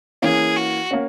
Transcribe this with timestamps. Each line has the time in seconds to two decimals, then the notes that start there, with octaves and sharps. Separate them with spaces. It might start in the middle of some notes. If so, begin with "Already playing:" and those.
0.22 E3 A#3 C#4 G#4
0.56 F#4
0.91 A#3 C#4